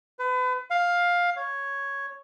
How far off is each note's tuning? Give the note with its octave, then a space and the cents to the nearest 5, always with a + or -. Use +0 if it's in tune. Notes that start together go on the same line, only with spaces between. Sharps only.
B4 +35
F5 +10
C#5 +0